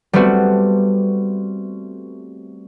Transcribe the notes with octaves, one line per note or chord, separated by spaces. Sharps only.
G3 A3 B3 C4 F#4